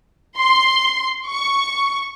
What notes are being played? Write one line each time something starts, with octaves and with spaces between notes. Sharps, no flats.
C6
C#6